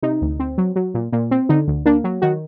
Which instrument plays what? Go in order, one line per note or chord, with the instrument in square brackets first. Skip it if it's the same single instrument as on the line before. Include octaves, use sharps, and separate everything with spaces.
[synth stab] C3 D#4
D2
C4
F#3
F#3
A#2
A#2
C4
D3 D#4
D2
A#3 D4
F#3
D#3 F#4